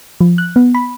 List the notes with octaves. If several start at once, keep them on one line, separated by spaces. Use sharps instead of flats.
F3
F#6
B3
B5